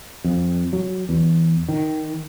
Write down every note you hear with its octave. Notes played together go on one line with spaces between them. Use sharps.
F2
F#3
E2
D#3